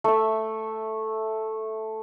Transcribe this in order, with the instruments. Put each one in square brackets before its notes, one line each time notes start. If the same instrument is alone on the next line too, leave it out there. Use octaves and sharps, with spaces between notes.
[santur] A3 E5